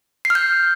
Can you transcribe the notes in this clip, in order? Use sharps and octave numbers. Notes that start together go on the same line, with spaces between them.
C7
F6
G6